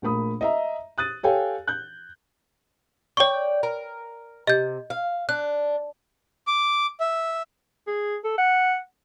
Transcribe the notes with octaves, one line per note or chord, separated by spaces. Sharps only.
A#1 A3 A#3 B5 D#6
D#5 E5 A#5
D#6 F#6 A6 D#7
G4 A4 C#5 F5 G5 G#5
F#6 G6
C#5 D5 G5 C#6
A#4
C3 D#5 G6
F5
D4 F#6
D6
E5
G#4
A4
F#5